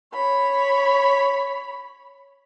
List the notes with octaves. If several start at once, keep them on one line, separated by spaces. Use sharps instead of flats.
C#5 B5